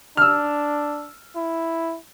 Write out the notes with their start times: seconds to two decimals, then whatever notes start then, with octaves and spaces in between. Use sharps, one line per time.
0.17 D4 E6 F6
1.36 E4